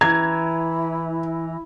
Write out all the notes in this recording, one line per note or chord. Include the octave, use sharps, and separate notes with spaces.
E3 E4 A#5 G#6